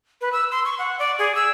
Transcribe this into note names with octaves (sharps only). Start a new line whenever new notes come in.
B4
E6
C6
C#6
F#5
D5
G#4
E6